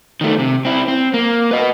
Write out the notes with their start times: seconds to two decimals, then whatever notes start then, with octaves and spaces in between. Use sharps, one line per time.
0.21 D#3 A3
0.39 C3
0.65 C4 E4
0.88 C4
1.14 A#3
1.51 B4 D#5